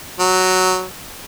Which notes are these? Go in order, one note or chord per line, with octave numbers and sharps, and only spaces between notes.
F#3